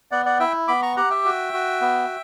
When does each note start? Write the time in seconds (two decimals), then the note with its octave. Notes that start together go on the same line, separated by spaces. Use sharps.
0.11 B3 D5 F#5
0.25 D5 F#5
0.40 E4 E5 G5
0.68 B3 B5 D6
0.82 A#5 C#6
0.96 G4 F#5 A#5
1.10 E5 G5
1.25 F#4
1.53 F#4
1.81 B3